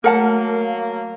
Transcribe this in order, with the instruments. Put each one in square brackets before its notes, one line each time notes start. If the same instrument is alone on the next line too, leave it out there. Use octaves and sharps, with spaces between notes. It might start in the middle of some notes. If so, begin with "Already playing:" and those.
[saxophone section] F#3 A#3 [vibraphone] A3 [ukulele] A#4 F#5 A5
[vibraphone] F5